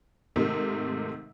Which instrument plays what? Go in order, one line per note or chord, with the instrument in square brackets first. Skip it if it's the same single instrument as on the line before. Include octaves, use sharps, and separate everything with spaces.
[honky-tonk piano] G#2 C3 D#3 A3 D#4